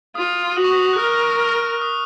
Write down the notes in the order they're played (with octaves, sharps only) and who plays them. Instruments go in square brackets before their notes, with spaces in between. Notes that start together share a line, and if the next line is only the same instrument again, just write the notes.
[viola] F4 [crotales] D#6
[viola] F#4 [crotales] D#6
[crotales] C#6
D#6
F#6
[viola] A#4 [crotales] F6
[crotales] F6
D#6